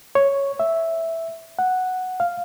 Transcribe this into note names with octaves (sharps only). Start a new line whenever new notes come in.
C#5
E5
F#5
F5